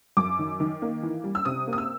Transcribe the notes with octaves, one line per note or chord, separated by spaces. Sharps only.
F#2 D6
D#3
D#3
A#3
E3
G3
E6
C3 D#6
A#3
D#6
E6